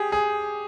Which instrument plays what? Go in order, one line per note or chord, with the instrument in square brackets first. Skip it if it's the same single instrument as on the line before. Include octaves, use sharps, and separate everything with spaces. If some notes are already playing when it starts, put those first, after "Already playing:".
Already playing: [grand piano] G4 G#4
G#4